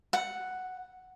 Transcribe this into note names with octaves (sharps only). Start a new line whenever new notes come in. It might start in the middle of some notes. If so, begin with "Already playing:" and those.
F#5